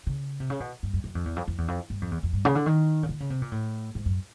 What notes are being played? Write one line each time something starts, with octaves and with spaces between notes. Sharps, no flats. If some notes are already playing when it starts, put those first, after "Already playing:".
C#3
C3
C#3
B2
G2
F#2
F#2
F2
E2
F2
F2
E2
F2
G2
F2
E2
F2
G2
C#3
D3
D#3
C#3
D3
C#3
C3
A#2
A2
G#2
F#2